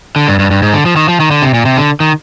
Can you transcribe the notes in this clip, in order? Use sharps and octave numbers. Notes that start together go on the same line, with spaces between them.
D3
G2
G2
G2
G#2
D3
F3
D#3
F3
D#3
D3
C3
A#2
C3
D3
D#3